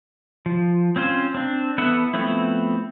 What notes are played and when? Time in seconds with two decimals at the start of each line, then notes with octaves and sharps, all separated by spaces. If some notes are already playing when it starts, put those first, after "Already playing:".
0.46 F3
0.96 C4 C#4 F4 C5
1.34 C4 D4
1.78 E3 B3 A4 E5 F#5
2.14 F3 A3 B3 C4 E4